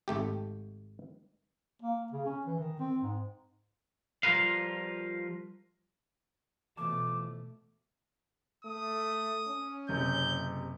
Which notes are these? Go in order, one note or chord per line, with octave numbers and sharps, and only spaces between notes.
G#1 A3 G4
A#3
C#3
C#4
E3
D#3
C4
G#2
F3 G3 F4 A#4 B4 F5
B2 E3 F3 A3 A5 D6
A3 D#6
C#4
F#1 C3 G6